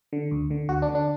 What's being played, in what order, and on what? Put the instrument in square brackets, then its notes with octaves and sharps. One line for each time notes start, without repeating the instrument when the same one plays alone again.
[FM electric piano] D3
D2
D3
D2 F#4
D4
D3
D4